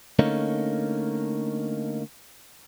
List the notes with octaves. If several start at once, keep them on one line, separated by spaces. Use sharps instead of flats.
D3 A3 A#3 C#4 D#4